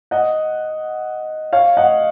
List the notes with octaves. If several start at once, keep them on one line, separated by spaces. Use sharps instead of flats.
D#5 F#5
C#5 F5
D#5 F#5